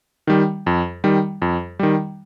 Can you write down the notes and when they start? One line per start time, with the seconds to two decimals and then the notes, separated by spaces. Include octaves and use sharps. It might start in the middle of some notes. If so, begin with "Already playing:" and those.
0.27 D#3 G3
0.66 F2
1.04 D#3 G3
1.42 F2
1.79 D#3 G3